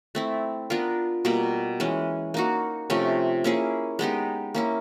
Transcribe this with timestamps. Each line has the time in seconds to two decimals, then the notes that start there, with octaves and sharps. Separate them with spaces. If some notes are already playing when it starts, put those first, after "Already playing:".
0.15 A3 C4 E4
0.70 B3 D4 F4 A#4
1.25 B2 G3 A#3
1.80 E3 G#3 C#4
2.34 A#3 D#4 F#4
2.90 C3 F3 A3 C#4
3.44 A#3 C#4 E4 G#4
3.99 G#3 B3 D#4 G4
4.55 A#3 C#4 E4